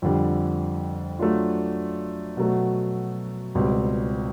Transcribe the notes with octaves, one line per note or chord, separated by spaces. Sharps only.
F2 D3 G3
F#3 A3 D4 F4
B2 F#3 A3
C#2 B2 G3 C4